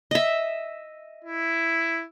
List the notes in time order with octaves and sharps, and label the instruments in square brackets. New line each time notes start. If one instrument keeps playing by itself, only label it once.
[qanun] D#5 E5
[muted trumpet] E4